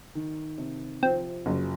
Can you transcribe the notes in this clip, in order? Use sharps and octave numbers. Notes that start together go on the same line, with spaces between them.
D#3
C3
F3 C4
F#1